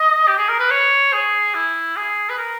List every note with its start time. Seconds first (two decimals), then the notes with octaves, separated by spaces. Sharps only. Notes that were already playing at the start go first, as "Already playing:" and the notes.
Already playing: D#5
0.28 G4
0.38 G#4
0.49 A#4
0.59 B4
0.71 C#5
1.13 G#4
1.54 E4
1.96 G#4
2.29 B4
2.38 A#4